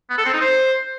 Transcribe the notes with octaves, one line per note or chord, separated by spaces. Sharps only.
B3
A4
C4
D#4
C5